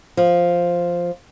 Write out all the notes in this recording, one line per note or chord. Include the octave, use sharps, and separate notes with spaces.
F3